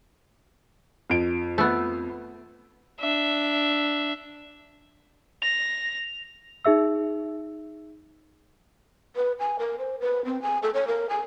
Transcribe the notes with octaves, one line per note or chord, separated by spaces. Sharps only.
F2 D7
A3 B3
D4 E5
A#6 F7
D#4 G#4 E5 E6
B4
G#5
A#4
C5
B4
C4
G#5
A4
C#5
A#4
G#5